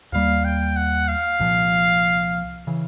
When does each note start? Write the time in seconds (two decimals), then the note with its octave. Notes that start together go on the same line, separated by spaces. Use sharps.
0.12 D#2 D#3 G3 A#3 F5
0.45 G5
0.76 F#5
1.08 F5
1.40 C2 A#2 F3
2.67 C#3 E3